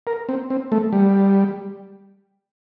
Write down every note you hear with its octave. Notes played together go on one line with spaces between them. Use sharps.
A#4
C4
C4
A3
G3